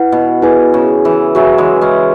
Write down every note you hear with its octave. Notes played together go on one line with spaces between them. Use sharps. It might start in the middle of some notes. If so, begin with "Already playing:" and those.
Already playing: E4 B4 F#5
B2
E4 G#4 B4 G#5
C#3
E3
C#3 F#3 F#4 E5 G#5
E3 G#3
G#3 C#4